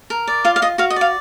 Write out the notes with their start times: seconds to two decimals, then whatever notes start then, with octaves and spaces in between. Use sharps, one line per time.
0.10 A#4
0.27 D5
0.45 F4 F5
0.56 F5
0.62 F4 D#5
0.78 F#4 F5
0.90 D#5
0.96 D5 F5